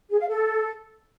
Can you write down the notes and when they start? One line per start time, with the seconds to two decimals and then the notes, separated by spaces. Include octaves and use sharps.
0.10 G#4
0.19 F5
0.28 A4